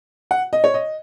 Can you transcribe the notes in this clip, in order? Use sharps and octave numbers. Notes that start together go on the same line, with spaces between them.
F#5
D#5
C#5
D#5